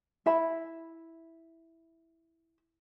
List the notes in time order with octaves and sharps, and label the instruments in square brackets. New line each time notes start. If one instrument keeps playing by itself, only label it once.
[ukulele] E4 E5 B5